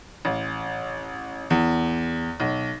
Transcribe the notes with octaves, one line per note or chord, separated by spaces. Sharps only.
A1
E2
B1